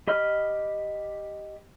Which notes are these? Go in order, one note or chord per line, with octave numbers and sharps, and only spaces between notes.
G4 D#5 B5 F6